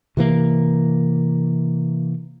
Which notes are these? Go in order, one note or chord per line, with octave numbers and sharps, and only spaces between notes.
C3 E3 A#3